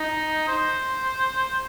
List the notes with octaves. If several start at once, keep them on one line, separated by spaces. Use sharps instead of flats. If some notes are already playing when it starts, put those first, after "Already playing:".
Already playing: D#4
C5